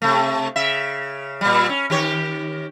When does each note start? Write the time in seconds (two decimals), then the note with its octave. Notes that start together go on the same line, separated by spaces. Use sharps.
0.02 C3 A3
0.56 C#3 E5
1.41 A#2 G3
1.69 C#4
1.90 D#3 G4 C#5